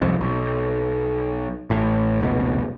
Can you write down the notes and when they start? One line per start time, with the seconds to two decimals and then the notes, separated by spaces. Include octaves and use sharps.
0.01 C2 F2 G#2
0.21 B1
1.70 A1 A2
2.21 F1 C#2 G#2 B2